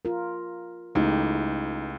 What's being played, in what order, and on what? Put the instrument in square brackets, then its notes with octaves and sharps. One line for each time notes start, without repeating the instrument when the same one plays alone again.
[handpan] F4 A#4
[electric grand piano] C#2 [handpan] A3 E4 G4 [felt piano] D#4